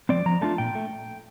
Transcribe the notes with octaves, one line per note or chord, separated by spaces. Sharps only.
F3 C4 D5
F3 A#5
A3 D4 F4 A5
A#2 G5
A3